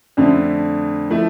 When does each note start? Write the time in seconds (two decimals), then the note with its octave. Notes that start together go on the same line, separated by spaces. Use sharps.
0.17 F2 D3 A3
1.10 F3 A3 E4